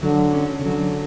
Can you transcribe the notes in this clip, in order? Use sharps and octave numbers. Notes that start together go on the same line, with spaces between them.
D3 F#3
C#4
C#3
D3 F#3